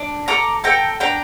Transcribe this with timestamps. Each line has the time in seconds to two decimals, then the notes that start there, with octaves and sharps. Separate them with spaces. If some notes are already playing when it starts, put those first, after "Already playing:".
Already playing: D4
0.28 A4 A#5 D6
0.64 A4 G5 A#5
1.00 D4 G5 A#5